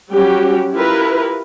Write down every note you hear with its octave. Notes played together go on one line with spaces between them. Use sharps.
F#3 G3 C#4 F#4 G4
E4 F4 G4 A#4 B4